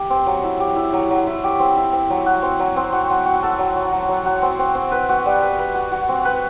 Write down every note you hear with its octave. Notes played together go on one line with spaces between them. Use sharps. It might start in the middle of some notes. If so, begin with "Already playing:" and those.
Already playing: G4
C4
F#3
E4
G4
E4
F#3
F#3
E4
G4
C4
E4
C4
F#3
F#4
C4
F#3
C4
F#4
F#3
F#4
A4
F#3
F#4
F#3
F#3
F#4
C4
C4
C4
B4
F#4
G3
B4
B4
F#4
F#4
C4
B4